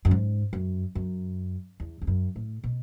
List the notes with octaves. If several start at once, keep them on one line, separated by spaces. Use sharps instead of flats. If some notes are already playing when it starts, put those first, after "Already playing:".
F#2
G#2
F#2
F#2
E2
E2
F#2
A2
B2